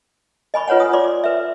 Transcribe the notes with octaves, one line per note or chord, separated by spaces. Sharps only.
D#5 G#5 B5 C#6
F4 B4 C#5 F#5 G#5
D#6
D5 C6 D6
B4 E5